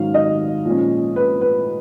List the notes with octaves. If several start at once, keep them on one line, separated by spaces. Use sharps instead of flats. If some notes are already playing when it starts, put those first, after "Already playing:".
Already playing: G#2 D#3 F#3 C#4 F5
D#5
A#2 F3 G#3 C#4
B4
B4